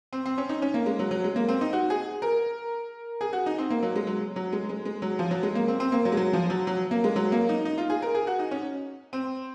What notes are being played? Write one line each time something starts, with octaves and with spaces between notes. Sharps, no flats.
C4
C4
C#4
D#4
C#4
A#3
G#3
F#3
F#3
G#3
A#3
C4
D#4
F#4
G#4
A#4
G#4
F#4
D#4
C4
A#3
F#3
G#3
F#3
F#3
G#3
G#3
G#3
F#3
F3
F#3
G#3
A#3
C4
C4
A#3
F#3
G#3
F#3
F3
F#3
F#3
A#3
G#3
F#3
A#3
D#4
D#4
F4
G#4
A#4
G#4
F#4
D#4
C#4
C4